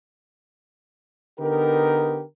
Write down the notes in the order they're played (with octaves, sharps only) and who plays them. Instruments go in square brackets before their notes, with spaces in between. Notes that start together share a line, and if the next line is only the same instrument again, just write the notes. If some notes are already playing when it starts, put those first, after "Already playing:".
[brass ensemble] D3 B3 D#4 G4 A#4